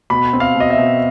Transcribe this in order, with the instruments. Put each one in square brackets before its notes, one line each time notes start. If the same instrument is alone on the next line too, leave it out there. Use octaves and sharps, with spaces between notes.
[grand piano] B2 B5
C4
F5
B2
D#5
E5
B2